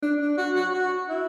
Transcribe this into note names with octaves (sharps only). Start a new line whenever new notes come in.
D4
D4
F#4
F#4
F#4
E4